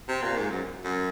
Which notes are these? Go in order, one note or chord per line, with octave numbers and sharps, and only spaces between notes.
C3
A#2
G#2
F#2
F#2